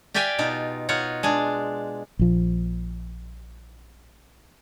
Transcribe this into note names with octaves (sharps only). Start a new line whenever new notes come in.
G4 D5 E5 F5 G5 G#5
B2 D#4 F4
D#4 F4 C#5 F#5
G#3 D4 G#4
A#1 F3